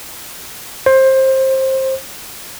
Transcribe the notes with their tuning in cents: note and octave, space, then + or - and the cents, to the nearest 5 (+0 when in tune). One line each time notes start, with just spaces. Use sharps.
C5 +20